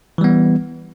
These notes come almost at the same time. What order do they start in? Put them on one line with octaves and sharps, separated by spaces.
E3 G3 B3